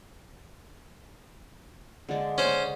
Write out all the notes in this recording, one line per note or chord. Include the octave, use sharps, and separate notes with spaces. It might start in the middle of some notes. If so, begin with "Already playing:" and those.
D3 G#3 D4
C#4 C5